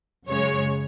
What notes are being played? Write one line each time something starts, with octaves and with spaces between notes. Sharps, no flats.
F#2 C#3 G#3 C#5